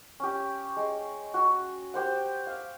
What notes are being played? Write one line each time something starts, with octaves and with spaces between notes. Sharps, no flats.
C#4 G4
G#3
F#4
G4 C5 F#5
F5